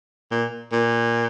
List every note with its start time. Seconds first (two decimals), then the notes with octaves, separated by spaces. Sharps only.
0.31 A#2
0.72 A#2